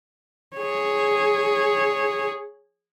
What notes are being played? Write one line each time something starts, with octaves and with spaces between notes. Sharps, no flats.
G#4 C#5